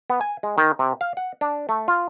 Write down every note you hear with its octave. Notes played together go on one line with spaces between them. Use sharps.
B3
G#5
G#3
D#3
C3
F5
F#5
D4
A3
F4